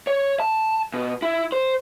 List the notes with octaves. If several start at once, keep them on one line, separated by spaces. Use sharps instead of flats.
C#5
A5
B2
E4
C5